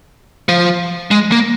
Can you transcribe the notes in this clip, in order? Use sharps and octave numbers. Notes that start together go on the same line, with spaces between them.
F3
G#3
A#3